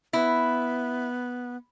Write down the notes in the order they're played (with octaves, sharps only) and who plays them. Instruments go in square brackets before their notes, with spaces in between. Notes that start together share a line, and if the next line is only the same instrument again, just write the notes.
[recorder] B3 [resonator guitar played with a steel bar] E4